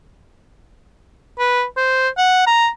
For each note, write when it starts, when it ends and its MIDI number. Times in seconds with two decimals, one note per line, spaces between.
1.39 1.64 71
1.77 2.09 72
2.17 2.42 78
2.47 2.69 82